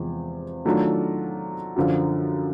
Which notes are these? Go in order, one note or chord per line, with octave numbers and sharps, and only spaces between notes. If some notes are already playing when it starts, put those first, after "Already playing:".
Already playing: E2 C3 F3 G#3
D#3 F#3 A3 D4 F4
F#2 D3 F3